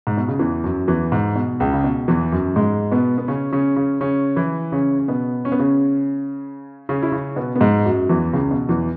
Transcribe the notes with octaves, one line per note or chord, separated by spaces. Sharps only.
G#2
B2
C#3
E2 E3
F#2 F#3
E2 E3
G#2
B2
C#2 C#3
C#3
B2
E2 E3
F#2 F#3
G#2 G#3
B2 B3
B3
C#3 C#4
C#3 C#4
C#3 C#4
C#3 C#4
E3 E4
C#3 C#4
C#4
B2 B3
C#4
B3
C#3 C#4
C#3 C#4
E4
C#3 C#4
B2 B3
B3
G#2 G#3
F#2 F#3
E2 E3
C#2 C#3
B2
E2 E3